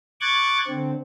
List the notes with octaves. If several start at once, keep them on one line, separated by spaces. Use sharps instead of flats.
C#6 D6 F#6 G#6 A6
D3 C4